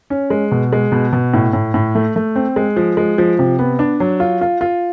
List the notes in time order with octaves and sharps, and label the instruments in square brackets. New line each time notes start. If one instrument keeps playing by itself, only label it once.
[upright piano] C#4
G#3
B2
G#3
B2
B2
A2
A2
A2
A3
A3
C4
G#3
F3
G#3
F3
C3
B3
D4
F#3
F4
F4
F4